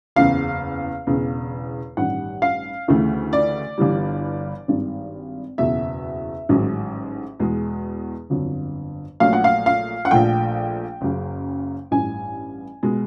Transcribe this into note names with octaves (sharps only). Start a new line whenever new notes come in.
F#1 E2 C#3 F5
E1 E2 C#3
A1 G2 D#3 G3 F#5
F5
D2 C#3 E3 A3
D5
G1 G2 E3 G3
G#1 G2 D#3
F#1 E2 B2 E5
A1 G#2 D#3 F#3
E2 B2 G#3
G1 F2 D3 F#3
A#1 A#2 F#3 A3 F5
F#5
F5
F5
F#5
A#1 A#2 F3 A3 G5
F#1 F#2 C#3
A1 G2 E3 G#5
B2 G#3